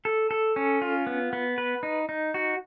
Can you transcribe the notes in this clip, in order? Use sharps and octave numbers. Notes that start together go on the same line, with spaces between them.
A4
A4
C#4
F4
B3
B3
B4
D#4
D#4
F#4